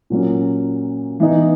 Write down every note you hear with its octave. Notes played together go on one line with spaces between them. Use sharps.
A#2 F#3 A#3 C#4
E3 B3 D#4